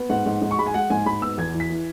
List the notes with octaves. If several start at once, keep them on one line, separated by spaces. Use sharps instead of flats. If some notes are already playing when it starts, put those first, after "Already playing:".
Already playing: B3
G#2 F#5
G#2
G#2
C#6
G#3 B5
G#5
G#3 F#5
G#2 G#5
G#2 B5
B3 E6
E2 G#6
E3
B6
E3